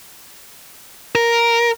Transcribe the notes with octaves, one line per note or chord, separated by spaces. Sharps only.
A#4